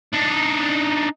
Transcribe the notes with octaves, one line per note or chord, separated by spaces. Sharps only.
D4 D#4